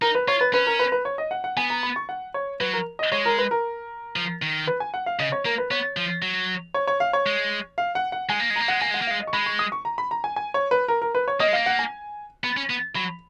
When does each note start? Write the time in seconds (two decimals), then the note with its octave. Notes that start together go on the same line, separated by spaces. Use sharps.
0.02 D#4 A#4
0.15 B4
0.28 F4 C#5
0.41 B4
0.53 C#4 B4
0.67 A#4
0.79 B4
0.92 B4
1.05 C#5
1.18 D#5
1.31 F#5
1.44 F#5
1.57 B3 G#5
1.70 A#5
1.83 B5
1.96 C#6
2.09 F#5
2.34 C#5
2.60 F#3 B4
2.73 A#4
2.99 D#5
3.12 G#3 C#5
3.26 A#4
3.38 B4
3.51 A#4
4.16 F3
4.42 D#3
4.67 B4
4.80 G#5
4.94 F#5
5.06 F5
5.19 C#3 D#5
5.32 C#5
5.45 A#3 A#4
5.58 B4
5.71 B3 C#5
5.97 F3
6.22 F#3
6.74 C#5
6.87 C#5
7.00 F5
7.13 C#5
7.26 G#3
7.78 F5
7.95 F#5
8.12 F#5
8.29 G#3 G#5
8.40 A#3
8.50 G#3
8.56 A#5
8.60 A#3
8.68 G#3 F#5
8.81 A#3 G#5
8.91 G#3 F#5
9.02 A#3
9.07 G#3 F5
9.20 D#5
9.27 C#6
9.33 G#3 B5
9.46 C#6
9.59 D#6
9.72 C#6
9.85 A#5
9.98 B5
10.11 A#5
10.24 G#5
10.36 G#5
10.54 C#5
10.71 B4
10.88 A#4
11.02 A#4
11.15 B4
11.28 C#5
11.40 A#3 D#5
11.48 G#3
11.53 A#3 F5
11.66 F#5
11.79 G#5
12.44 B3 B5
12.57 C#4
12.70 B3
12.95 F#3 B5